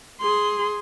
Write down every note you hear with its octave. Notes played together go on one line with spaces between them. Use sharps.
G#4 C6